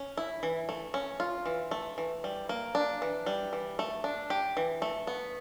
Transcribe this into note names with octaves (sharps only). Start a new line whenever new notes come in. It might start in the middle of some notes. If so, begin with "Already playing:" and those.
Already playing: C#4
E4
E3
A3
C#4
F4
E3
A3
E3
G3
A#3
D4
E3
G3
E3
A3
D4
G4
E3
A3
B3